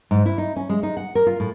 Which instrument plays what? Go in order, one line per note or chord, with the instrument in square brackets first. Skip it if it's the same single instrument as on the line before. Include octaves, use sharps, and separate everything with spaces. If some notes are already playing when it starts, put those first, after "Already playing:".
[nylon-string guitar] G#2
E4
D#4
C#4
G#3
D#4
F#5
A#4
F4
A2